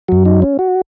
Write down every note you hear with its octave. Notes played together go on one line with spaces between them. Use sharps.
F#2 F#3 F#4
D#4
C#4
F#4